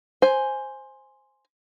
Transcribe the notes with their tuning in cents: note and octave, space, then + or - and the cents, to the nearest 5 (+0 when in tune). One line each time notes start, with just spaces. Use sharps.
C5 +5 G#5 +0